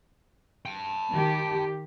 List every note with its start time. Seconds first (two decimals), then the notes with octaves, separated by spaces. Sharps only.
0.65 G5 A5
1.12 D#3 G4